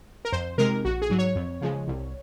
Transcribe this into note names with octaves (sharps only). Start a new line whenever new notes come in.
A#4
F2 C5
C3 D#3 G#3 A#4
A#1 F#4
G#4
G#2 F#3
C#5
F2
C#3 F3 G#3
C2